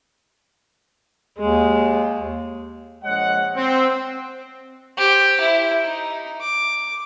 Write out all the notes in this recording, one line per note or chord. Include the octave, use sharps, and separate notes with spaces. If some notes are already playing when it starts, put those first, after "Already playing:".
D#2 G#3
A#1 G#3 C#5 F#5
C4
G4 C5
E4
D#4
D6